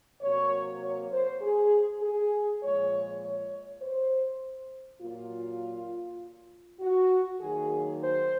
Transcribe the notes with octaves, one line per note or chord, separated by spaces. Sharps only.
C3 F#3 A#3 C#5
C#5
C5
G#4
G#4
A#2 F3 G#3 C#5
C#5
C5
A#2 F#3 A#3 F4
F#4
D#3 F#3 A#3 G#4
C5